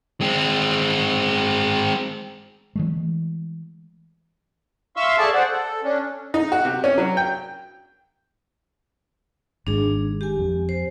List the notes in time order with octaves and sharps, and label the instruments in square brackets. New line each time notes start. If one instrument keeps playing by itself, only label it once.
[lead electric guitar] G#3 C4
[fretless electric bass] E3 G#3 A3
[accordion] E5 F5 C6 C#6 E6
G#4 A4 D5 A5
C5 D5 F#5
A4
C#4 D4
[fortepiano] D#4
F#4
C3
C#4
F#3
G5
[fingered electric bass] G#1 G#2 [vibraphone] D4 G#4
[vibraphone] G4 G#5
[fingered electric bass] F2
[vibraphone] C5